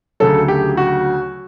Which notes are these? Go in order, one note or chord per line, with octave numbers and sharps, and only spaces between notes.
D2 C#3 F#3 A4
G4
F#4